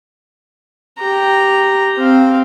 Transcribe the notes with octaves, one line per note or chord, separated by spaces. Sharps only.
G4 A#5
C4 F5